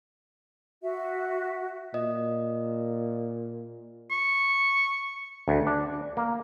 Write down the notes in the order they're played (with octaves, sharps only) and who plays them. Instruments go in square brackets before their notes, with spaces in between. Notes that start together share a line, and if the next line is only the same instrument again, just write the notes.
[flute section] F#4 E5
[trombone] A#2 [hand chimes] D#5
[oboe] C#6
[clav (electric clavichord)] D2
D4
A#3